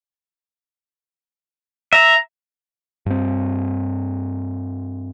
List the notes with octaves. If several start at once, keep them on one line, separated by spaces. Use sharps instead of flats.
E5 A#5
G2 C4